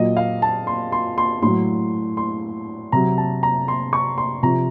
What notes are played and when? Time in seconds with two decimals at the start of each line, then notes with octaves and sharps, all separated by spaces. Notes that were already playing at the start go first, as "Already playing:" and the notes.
Already playing: A#2 F#3 D#5
0.17 F5
0.42 A5
0.67 C6
0.92 C6
1.18 C6
1.42 A2 F#3 C6
2.17 C6
2.92 C3 F#3 A#5
3.18 A5
3.43 A#5
3.68 C6
3.93 C#6
4.18 C6
4.43 C3 F3 A#5